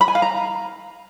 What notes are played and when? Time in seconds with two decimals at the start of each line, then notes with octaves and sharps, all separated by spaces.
0.01 B5
0.08 G#5
0.15 F5
0.22 A#5